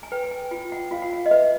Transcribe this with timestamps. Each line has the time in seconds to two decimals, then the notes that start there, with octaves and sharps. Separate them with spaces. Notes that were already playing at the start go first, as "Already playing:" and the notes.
0.03 G#5
0.12 B4 G5
0.31 G#5
0.51 F4 G5
0.72 F#5
0.91 F4 F5
1.02 F#5
1.13 F5
1.26 D#5
1.31 B4 E5